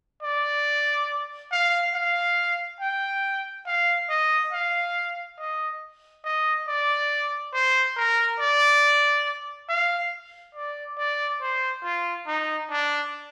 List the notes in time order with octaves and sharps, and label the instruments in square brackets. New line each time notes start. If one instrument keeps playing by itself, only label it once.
[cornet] D5
F5
F5
G5
F5
D#5
F5
D#5
D#5
D5
C5
A#4
D5
F5
D5
D5
C5
F4
D#4
D4